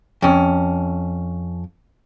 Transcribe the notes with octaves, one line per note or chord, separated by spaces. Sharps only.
F2 C#4